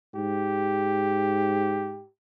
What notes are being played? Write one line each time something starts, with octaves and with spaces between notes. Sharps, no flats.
G#2 G4